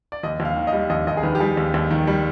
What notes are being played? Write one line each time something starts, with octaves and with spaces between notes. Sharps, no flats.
D5
D#2 D#5
D#2
F5
D#3
F5
D#5
G3
D#2 D#5
D#2 D#5
G#4
D#3 B4
G4
G3 G#4
D#2
D#2
D#3
G3